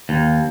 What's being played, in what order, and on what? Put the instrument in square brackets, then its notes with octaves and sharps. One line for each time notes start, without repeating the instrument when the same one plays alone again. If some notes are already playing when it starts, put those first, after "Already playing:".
[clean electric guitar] D#2